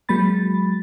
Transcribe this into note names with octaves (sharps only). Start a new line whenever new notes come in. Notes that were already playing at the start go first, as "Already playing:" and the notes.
F#3 G#3 A#3 B5 A6